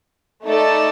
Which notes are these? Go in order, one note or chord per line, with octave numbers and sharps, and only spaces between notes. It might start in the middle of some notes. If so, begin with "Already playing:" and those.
A3 D#4 A4 D5